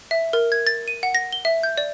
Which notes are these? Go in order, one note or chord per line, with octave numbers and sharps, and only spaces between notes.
E5
A#4
G#6
A6
D#7
F#5
A#6
G7
E5
G6
D5